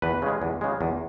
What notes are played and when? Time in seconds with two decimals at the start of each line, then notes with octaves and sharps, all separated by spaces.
0.02 E2 B4
0.22 C#3 G#3
0.42 E2
0.61 C#3 G#3
0.81 E2